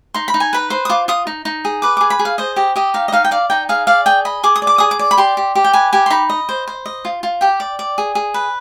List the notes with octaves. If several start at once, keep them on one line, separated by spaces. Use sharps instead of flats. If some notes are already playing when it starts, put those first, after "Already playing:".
D#4 C6
B5
D#4
G#5
B4 B5
C5 C6
D#6
F4 D6
F4 D#6
D#4
D#4
G#4
B4 D6
G#4 D6
B5
G#4
F5
C5 D#5
G4 D#5
G4 D#5
D#4 F5
D#5
D#4 F5
G5
D5 F5
D#4 G5
G#4 F5
D5 F5
G#4 G5
D#5 B5
G#4 D6
D#6
D5
D6
G#4 D#6
D6
D5
B5
G4 C6
G4
G4
G5
B4 G#5
G4 G#5
C6
D#4 B5
D#5
C5
C5
D#5
F4
F4
G4 G5
D5
D5
G#4
G#4
B4